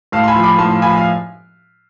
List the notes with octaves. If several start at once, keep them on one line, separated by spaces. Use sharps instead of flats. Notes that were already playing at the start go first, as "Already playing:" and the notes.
A2 F5 A5
C6
G#5 B5
F3
B5 D6
A2 A5 C6
F3 G#5 B5
F5